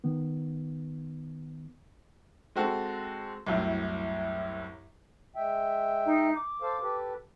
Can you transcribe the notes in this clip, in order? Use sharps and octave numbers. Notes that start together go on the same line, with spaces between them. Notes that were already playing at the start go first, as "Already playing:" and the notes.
D#3 B3
G#3 C4 F#4 A4
C2 F#2 A2
G#3 E5 G5
D#4
D6
A4 C5 F5
G4 A4 B4